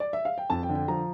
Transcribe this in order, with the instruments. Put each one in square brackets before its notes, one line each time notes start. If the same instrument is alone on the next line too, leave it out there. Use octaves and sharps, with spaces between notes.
[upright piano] D5
E5
F5
G5
F2 A5
G5
D3
G5
F3 A#5